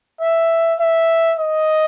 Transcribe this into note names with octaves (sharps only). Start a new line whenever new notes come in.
E5
E5
D#5